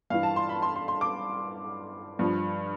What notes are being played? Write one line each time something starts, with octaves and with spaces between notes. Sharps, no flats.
G2 E3 F5
A5
C6
B5
C6
C6
C6
D6
G2 F3